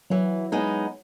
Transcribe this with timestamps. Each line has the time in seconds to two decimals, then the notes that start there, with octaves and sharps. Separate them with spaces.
0.10 E3 F#3
0.52 G#3 B3 D#4